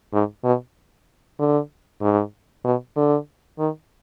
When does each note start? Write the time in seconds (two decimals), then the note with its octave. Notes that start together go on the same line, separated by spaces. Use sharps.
0.13 G#2
0.44 B2
1.39 D3
2.02 G#2
2.64 B2
2.97 D3
3.59 D#3